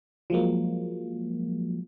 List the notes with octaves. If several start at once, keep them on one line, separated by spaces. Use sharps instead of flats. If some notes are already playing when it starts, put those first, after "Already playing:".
F3 F#3 G#3 A#3